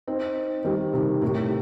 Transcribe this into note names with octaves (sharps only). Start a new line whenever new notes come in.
C4 D#4
D#3 G3
C3 D#3
A2 C3